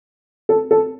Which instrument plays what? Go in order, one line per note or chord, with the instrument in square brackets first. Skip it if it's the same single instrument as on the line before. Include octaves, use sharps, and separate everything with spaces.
[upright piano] A4
A4